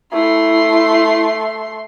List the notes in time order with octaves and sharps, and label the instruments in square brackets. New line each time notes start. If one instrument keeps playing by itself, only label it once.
[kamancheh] A3 C6 [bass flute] E4